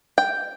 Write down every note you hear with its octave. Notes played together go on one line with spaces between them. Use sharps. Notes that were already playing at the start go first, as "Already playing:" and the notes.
G5